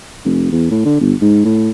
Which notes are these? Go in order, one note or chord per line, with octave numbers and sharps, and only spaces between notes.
F1
E2
A2
D3
G1
G#2
A2